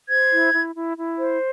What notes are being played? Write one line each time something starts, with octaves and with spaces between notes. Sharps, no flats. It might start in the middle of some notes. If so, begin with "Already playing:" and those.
C5 G#6
E4
E4
E4
E4
C5